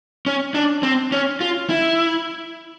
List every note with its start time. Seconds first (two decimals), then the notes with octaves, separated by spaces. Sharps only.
0.26 C#4
0.54 D4
0.83 C4
1.12 C#4
1.41 F4
1.69 E4